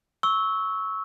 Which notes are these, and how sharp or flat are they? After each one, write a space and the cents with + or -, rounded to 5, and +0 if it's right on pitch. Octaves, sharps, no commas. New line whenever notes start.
C#6 +0 E6 -15